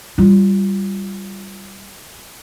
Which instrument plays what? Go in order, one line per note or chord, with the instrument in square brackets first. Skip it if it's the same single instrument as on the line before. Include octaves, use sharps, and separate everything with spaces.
[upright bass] G3 F4